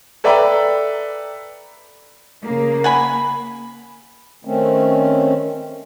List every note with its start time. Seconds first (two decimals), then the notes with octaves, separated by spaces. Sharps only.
0.24 A4 B4 D5 E5 G5 A#5
2.44 C#3 A#3
2.84 F#5 G#5 B5
4.45 D#3 A3 C4 C#4